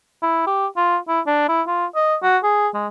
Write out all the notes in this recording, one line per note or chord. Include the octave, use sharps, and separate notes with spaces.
E4
G4
F4
E4
D4
E4
F4
D#5
F#4
G#4
G#3